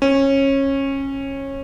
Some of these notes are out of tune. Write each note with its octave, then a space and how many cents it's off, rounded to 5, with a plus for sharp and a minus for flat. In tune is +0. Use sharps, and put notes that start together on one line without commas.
C#4 -20